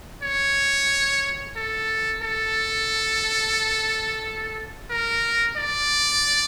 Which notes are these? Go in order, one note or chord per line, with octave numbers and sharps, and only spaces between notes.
C#5
A4
A4
A#4
D5